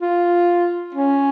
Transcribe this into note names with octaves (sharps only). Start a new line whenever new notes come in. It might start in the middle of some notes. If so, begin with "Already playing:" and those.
F4
C#4